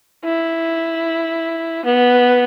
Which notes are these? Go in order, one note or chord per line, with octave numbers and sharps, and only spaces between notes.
E4
B3